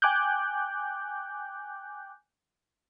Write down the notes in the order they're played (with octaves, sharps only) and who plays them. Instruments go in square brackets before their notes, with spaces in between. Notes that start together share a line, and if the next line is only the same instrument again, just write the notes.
[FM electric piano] G5 G#5 D6 F#6 G6